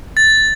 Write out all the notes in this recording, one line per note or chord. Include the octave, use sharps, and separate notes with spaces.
A6